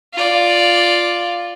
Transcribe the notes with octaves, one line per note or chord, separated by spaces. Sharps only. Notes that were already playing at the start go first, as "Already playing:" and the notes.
F4 D5